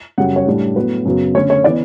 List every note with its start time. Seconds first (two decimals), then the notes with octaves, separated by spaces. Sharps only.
0.18 F#2 C#3 G3 F#5
0.36 C#5
0.47 A2 G3 D4
0.75 A2 F#3 B3 B4
1.05 F#2 C#3 F#3 B3
1.35 D3 A3 C#4 C#5
1.50 C#5
1.64 E3 B3 D5